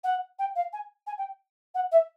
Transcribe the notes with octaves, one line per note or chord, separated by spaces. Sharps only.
F#5
G5
F5
G#5
G#5
G5
F#5
E5